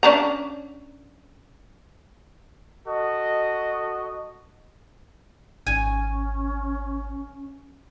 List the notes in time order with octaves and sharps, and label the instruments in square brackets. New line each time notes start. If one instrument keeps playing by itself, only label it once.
[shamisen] C#4 D4 A#5
[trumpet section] F#4 A4 D#5
[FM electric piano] G#1 [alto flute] C#4 [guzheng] G#5